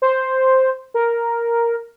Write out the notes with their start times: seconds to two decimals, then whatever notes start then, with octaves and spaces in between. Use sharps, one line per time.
0.02 C5
0.94 A#4